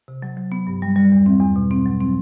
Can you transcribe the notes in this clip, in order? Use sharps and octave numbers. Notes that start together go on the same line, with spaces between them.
C3
F#3
F#3
B3
G2
G3
G3
E2
C4
E2
B2
C4
F#3
C4